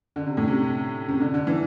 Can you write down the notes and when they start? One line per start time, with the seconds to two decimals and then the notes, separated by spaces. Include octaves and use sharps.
0.16 D3
0.27 C3
0.37 A2
0.48 C3
1.09 C3
1.20 D3
1.34 D3
1.47 E3